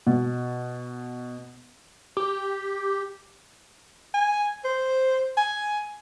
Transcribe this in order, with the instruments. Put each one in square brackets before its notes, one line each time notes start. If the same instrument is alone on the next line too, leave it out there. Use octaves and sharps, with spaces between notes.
[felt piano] B2
[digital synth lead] G4
[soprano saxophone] G#5
C5
G#5